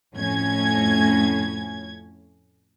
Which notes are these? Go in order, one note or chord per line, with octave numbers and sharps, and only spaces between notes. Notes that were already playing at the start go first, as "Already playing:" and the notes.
F2 A2 C#4 G#6